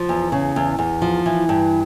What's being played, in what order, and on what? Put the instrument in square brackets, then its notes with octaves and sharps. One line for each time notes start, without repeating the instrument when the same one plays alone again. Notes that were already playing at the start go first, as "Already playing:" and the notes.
Already playing: [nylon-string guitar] F3
E2
C#3
E2
E2
F3
E3
G2